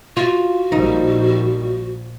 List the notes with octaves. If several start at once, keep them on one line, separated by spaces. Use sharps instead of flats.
F4 F#4
A#1 F3 G3 D#4